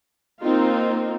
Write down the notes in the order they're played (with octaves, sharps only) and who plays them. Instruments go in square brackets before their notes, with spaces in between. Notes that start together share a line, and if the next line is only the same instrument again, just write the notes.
[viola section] A#3 C4 D#4 F4